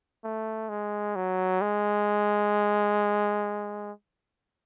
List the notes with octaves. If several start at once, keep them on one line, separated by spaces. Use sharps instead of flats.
A3
G#3
F#3
G#3